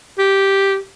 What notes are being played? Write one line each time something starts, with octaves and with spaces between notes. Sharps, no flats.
G4